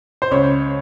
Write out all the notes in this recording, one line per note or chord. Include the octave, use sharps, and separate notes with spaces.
C5
C#2 C#5